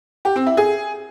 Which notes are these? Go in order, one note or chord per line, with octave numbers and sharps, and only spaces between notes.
G4
C4
E4
G#4